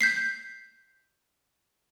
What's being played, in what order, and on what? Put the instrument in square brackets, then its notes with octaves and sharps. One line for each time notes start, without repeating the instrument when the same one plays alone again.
[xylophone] G6 B6 C7